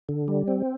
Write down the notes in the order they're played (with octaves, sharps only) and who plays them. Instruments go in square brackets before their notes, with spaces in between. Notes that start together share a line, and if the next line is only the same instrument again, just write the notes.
[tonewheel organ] D3
G3
C4